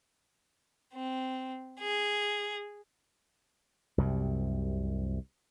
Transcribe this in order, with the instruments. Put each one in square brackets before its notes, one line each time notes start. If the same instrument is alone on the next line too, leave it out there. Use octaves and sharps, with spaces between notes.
[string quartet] C4
G#4
[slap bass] C2 F#2 C3